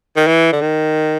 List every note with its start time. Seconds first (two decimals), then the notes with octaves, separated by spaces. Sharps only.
0.17 D#3
0.27 E3
0.53 D3
0.61 D#3